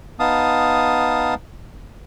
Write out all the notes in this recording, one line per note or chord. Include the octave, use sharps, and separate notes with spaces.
B3 D#4 F5 A5 D#6